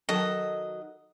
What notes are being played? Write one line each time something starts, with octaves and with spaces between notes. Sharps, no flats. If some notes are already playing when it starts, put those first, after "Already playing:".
D#3 F#3 A4 D#5